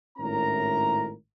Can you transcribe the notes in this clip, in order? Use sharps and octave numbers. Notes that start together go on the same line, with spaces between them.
G#1 A2 C#4 E4 A#4 A#5